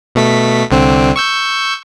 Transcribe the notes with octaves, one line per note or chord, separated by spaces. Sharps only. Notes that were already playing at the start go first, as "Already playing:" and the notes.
B2 A3 B6
C2 D3 C4
C#6 E6 G6